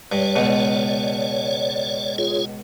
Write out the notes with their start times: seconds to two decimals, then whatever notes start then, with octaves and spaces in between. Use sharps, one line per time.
0.12 G2 C#5 D5
0.35 C#2 B2
2.18 F4 G#4 C#5